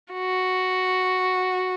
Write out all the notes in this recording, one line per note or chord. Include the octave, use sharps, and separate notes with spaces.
F#4